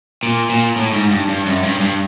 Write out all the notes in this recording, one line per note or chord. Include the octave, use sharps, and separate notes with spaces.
A#2
A#2
A2
G#2
G2
G2
F#2
G2
G2